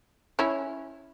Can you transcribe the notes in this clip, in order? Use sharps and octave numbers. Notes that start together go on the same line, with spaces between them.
C#4 E4